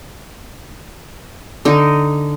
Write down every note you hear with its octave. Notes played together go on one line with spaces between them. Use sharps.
D3 D#4